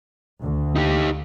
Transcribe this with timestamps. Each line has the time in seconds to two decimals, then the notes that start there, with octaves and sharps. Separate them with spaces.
0.42 D2
0.76 D#4 G4